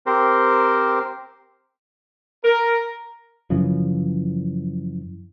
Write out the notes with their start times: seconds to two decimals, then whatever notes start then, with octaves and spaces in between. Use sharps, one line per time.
0.06 C4 G4 A#4 C5
2.44 A#4
3.50 F#2 C#3 E3 F3